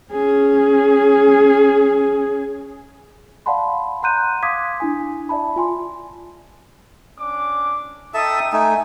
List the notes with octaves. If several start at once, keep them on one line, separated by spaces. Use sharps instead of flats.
C#4 G#4
D5 F5 F#5 A5 B5 C6
F#5 A#5 C6 F#6 G6 D#7
F5 C6 D6 D#6 G#6 B6
D4 E4 G#5
D5 E5 A5 B5
F4 G#5 C6
C#4 D4 D6
D#4 A4 E5 G5 A5 D#6
A3 D#4 G#5